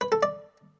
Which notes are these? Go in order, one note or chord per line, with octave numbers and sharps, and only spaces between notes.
B4
A4
D5